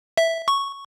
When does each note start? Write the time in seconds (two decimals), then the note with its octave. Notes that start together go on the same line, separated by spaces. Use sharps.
0.17 E5
0.48 C#6